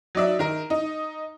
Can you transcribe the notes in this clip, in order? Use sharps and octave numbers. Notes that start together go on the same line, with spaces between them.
F#3 D#4 D5 E5
D#3 A#4
D#4